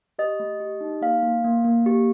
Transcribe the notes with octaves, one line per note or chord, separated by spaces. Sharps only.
G4 D#5
A3
G4
D#4
A#3 F5
A#3
A#3
A#3
G4